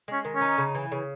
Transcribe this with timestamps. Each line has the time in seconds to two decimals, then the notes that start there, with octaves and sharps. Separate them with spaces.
0.08 G#3 C#4
0.25 D#3
0.35 C#4
0.41 D#4
0.58 C#3
0.75 E3
0.92 C#3